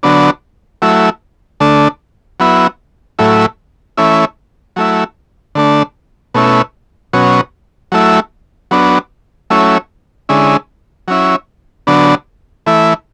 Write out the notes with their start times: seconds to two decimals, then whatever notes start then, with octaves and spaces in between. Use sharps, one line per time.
0.03 D3 F#3 B3 D4
0.82 F#3 A3 E4
1.60 D3 A3 D4
2.40 F#3 B3 E4
3.19 A2 F#3 A3 E4
3.97 E3 A3 C#4 E4
4.76 F#3 A3 E4
5.55 D3 A3 D4
6.34 B2 A3 C#4 E4
7.13 B2 F#3 C#4
7.92 F#3 A3 E4
8.71 F#3 B3 D4
9.50 F#3 A3 C#4 E4
10.29 D3 G#3 C#4 E4
11.08 F#3 C#4 E4
11.87 D3 F#3 B3 D4
12.67 E3 A3 E4